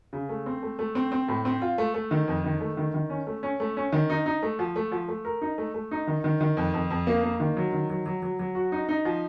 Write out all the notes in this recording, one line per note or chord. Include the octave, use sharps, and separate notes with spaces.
C#3
A3
C4
A3
A3
C4
C4
A2
C4
F4
A3
A3
D#3
F2
D#3
A3
D#3
D#3
C#4
A3
C#4
A3
C#4
D#3
D#4
D#4
A3
F3
A3
F3
A3
A#4
D#4
A3
A3
D#4
D#3
D#3
D#3
F2
F2
F2
A#3
A#3
D#3
F#3
D#3
F#3
F#3
F#3
F#3
F#4
D#4
D#4
F3